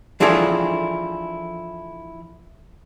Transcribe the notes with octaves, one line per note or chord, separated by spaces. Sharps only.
E3 F3 D4 E4 G#4 A4